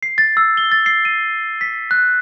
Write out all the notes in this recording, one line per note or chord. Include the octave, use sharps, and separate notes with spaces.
C7
A6
E6
G7
A6
C7
D#7
B6
F#6